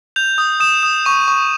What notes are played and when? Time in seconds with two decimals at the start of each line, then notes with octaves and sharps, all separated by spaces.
0.16 G6 F7
0.38 D#6
0.60 D#6 E7
0.83 D#6
1.05 C#6 D#7
1.28 C#6